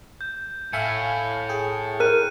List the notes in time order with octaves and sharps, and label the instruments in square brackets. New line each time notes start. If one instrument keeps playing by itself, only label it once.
[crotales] G6
[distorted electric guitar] A2 [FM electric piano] E5 F5 G#5 [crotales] C#7
[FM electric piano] G#4 G5
[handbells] A#4 [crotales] F#6 D#7